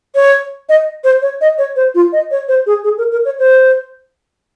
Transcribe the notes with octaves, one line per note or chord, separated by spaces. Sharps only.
C#5
D#5
C5
C#5
D#5
C#5
C5
F4
D#5
C#5
C5
G#4
G#4
A#4
A#4
C#5
C5